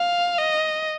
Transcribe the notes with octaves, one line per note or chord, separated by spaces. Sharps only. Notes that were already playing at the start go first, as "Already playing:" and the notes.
Already playing: F5
D#5